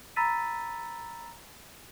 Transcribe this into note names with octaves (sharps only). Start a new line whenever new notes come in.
A#5 B5 E6 A6 B6 D#7